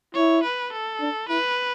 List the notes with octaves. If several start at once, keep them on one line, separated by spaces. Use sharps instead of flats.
E4 C#5
B4
A4
D4
E4 B4